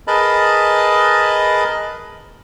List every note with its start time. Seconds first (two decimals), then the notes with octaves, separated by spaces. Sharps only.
0.07 G#4 A#4 B4 D#5 A5 B5